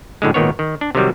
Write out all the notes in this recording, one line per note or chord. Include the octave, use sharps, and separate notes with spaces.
F#2 A2 D3 G#3
G#1 A#2 D#3 B3 C#5
D#3
D4
C3 D#3 F#3 G3